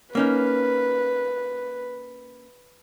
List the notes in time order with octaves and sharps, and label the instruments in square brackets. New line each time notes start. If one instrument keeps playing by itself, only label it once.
[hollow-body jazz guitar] A#3 C#4 D#4 [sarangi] B4